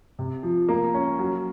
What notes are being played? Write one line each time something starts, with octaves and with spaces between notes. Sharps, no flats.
C3
F3
A#3
C#4
F#3